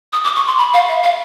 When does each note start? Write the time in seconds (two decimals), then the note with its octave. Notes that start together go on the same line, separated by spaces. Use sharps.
0.13 D#6
0.24 D6
0.36 C#6
0.47 C6
0.58 B5
0.73 F5
0.88 E5
1.03 F5